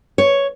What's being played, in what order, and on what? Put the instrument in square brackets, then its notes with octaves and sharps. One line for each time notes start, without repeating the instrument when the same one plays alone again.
[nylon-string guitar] C#5